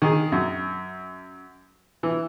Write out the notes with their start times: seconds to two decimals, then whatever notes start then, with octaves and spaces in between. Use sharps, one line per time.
0.02 D#3 G#4
0.32 F#2
2.03 E3